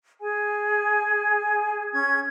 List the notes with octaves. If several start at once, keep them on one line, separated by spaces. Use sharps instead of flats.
G#4 G#5
C#4 G#6